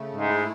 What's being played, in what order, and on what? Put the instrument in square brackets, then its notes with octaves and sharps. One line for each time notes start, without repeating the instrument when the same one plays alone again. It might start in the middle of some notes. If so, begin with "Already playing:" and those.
Already playing: [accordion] C#3 A3
[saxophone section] G#2
[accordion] E4